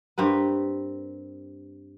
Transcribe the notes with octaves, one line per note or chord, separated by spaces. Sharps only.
G2 C4 A#4 B4